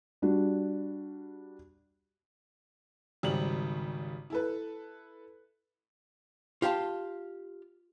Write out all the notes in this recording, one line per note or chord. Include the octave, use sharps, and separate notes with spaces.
G3 D4 F#4
G#1 C#3 G3 F#7
E4 A4 B4
F4 G4 F5 A5